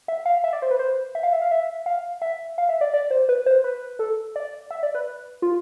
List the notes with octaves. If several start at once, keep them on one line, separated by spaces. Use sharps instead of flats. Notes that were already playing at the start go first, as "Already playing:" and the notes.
E5
F5
E5
D5
C5
B4
C5
E5
F5
E5
F5
E5
F5
E5
F5
E5
D5
D5
C5
B4
C5
B4
A4
D5
E5
D5
B4
F4